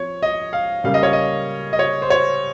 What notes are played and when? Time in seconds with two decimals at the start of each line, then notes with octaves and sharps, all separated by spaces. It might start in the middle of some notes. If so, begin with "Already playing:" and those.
Already playing: F3 C4 C#5
0.22 D#5
0.53 F5
0.84 C#3 G3 A#3 F5
0.94 D#5
1.03 C#5
1.13 D#5
1.73 D#5
1.79 C#5
2.02 C5
2.10 C#5